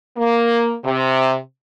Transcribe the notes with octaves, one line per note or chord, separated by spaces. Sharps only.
A#3
C3